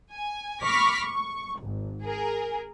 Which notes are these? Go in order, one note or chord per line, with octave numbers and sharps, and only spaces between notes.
G#5
B5 C#6 D6 F6 A#6 B6
C#6
G#1
G#4 A#4